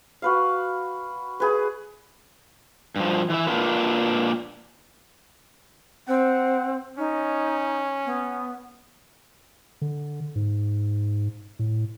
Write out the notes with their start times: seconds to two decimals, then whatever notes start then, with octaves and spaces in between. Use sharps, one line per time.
0.22 F#4 B4 F5
1.40 G#4 B4
2.96 G2 F3
3.30 E3 E5
3.47 A#3 D4 F4 B4
6.08 C4 F#5
6.98 C#4 D#4
8.06 B3
9.81 D3
10.36 G#2
11.59 A2